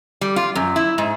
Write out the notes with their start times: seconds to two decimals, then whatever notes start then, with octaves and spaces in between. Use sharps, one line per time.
0.21 G3
0.36 F4
0.55 F#2
0.76 E4
0.98 G#2